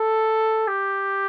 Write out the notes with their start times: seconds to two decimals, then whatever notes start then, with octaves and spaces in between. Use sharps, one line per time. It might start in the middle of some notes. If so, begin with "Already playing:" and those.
Already playing: A4
0.68 G4